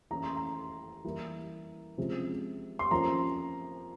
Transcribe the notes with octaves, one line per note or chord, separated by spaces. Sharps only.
E3 A#3 C#4 A#5
C6
A#5
E3 G3 A#3
C3 F3 G#3 C#4
C6
F3 A#3 C#4 A#5